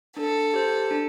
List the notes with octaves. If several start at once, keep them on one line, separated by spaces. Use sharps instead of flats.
D4 A4
G4 C5
D4